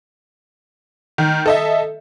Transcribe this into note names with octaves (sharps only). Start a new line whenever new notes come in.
D#3
A4 D#5 E5